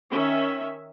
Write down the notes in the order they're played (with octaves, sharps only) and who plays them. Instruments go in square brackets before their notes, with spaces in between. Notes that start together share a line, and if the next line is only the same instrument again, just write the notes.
[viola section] D#3 C#4 E5